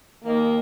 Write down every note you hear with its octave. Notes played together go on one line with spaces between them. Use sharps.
D#2 D#3 A#3